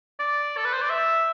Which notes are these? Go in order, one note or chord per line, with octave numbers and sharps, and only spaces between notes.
D5
A4
B4
C5
D5
E5